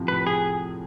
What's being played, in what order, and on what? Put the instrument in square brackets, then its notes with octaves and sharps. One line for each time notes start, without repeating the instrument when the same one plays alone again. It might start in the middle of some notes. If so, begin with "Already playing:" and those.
Already playing: [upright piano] A2 C3 F3
[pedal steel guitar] B4
G#4